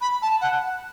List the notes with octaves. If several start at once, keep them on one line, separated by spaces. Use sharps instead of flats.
B5
A5
F#5